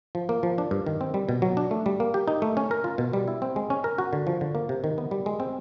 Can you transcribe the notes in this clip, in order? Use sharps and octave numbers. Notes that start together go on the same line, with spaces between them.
F3
A#3
F3
D4
G2
D#3
C4
G3
B2
F#3
D4
A3
G3
A#3
G4
D#4
A3
C#4
A#4
F4
B2
G3
E4
C4
G#3
C#4
A#4
F#4
D3
F3
D3
A#3
C3
D#3
B3
G3
G#3
C4